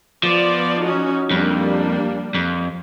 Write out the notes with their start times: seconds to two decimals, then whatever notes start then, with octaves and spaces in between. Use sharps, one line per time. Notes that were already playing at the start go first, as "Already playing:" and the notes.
0.23 F3 B3 F4 D5
0.80 C#4 D#4 F#4
1.31 F2 G3 A#3 D4
2.34 F2